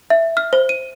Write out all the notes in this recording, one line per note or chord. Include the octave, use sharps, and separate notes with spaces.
E5
F6
C5
D#7